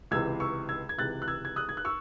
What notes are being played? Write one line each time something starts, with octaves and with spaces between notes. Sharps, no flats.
C#2 C3 E3 E6 G#6
C#6 E6
E6 G#6
G#6
C#2 C3 E3 F#6 A6
F#6
E6 G#6
G#6
D#6 F#6
G#6
F#6
C#6 E6